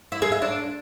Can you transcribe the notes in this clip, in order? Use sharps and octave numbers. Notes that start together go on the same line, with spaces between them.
E4
G#4
E5
D4